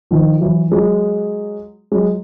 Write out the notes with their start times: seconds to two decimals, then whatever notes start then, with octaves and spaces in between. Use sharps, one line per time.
0.11 D#3 F3
0.41 E3 F#3
0.71 F#3 G#3
1.92 F#3 G#3